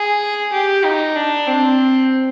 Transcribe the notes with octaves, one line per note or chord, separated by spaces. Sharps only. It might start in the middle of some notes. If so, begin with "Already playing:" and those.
Already playing: G#4
G4
D#4
D4
C4